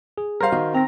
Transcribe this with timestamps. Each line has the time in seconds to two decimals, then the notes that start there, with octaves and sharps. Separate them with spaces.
0.18 G#4
0.41 G3 A#4 C5 F5
0.52 D#3 F#4 D#5 F5
0.75 C4 A#5 A#6